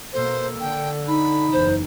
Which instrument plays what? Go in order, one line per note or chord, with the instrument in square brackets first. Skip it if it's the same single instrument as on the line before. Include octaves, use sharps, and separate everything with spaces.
[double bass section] B2 A#3 [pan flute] A4 [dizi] C5
[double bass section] D3 [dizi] G5
[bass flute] D#4 [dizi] B5
[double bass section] F#1 E2 [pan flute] C5